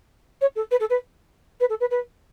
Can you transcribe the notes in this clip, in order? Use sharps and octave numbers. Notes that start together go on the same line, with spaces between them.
C#5
A4
B4
A4
B4
B4
A4
B4
B4